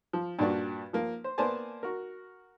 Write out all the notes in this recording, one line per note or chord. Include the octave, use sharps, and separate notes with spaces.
F3
G2 A#2 D4 F#4
F3 A#3
C5
A#3 B3 C5 D5 G#5 A5
F#4 A#4